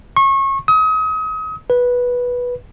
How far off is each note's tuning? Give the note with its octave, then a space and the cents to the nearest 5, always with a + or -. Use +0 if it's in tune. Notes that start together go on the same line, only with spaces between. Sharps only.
C#6 -30
D#6 +35
B4 -10